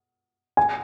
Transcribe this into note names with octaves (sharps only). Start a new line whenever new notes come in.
G#5